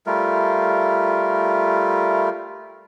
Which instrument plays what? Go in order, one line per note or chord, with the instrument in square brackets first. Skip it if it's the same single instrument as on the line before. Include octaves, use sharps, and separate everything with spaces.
[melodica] G3 A3 F4 A#4